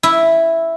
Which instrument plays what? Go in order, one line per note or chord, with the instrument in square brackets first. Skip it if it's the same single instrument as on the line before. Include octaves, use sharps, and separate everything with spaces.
[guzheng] E4